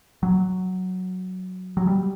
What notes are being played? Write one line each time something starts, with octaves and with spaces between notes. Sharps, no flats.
F#3
F#3
G3